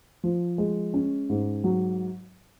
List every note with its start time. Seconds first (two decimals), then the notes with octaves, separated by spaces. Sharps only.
0.23 F3
0.58 G#3
0.94 C#4
1.30 G#2
1.64 F#3